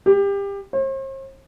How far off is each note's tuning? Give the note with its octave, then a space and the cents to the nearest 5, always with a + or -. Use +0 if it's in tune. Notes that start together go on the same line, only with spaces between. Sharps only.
G4 +25
C5 +45